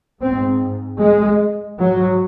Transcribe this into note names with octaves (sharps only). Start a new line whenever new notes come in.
G#2 C4
G#3
G#2 F#3